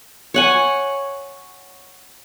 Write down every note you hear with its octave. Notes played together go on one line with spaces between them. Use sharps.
C#5 F#5 G#5